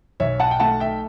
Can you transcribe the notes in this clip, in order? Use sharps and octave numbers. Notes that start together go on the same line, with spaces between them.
B1 C#5 E5
F#5 A5
G5
A3 F#5 A5
E5 G5